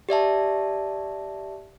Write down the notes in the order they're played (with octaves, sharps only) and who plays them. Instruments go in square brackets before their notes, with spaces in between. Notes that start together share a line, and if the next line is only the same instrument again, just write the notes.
[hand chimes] G4 D5 E5 A5